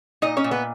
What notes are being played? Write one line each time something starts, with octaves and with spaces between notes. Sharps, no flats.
A#2 D#4 D#5
C#4 C#5
A#2
B3 B4